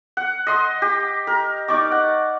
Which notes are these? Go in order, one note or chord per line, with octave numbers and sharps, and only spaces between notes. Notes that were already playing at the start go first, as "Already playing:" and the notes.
F#5
D#5 C6 D#6
G4
A#4
D#4 D5 C#6 D6
F#5